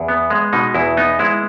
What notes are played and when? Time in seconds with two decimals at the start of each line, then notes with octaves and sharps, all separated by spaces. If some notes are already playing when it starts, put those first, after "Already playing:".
Already playing: E2
0.08 B3
0.30 G#3
0.53 B2 D#4
0.74 E2 E4
0.97 B3 D#4
1.19 G#3 E4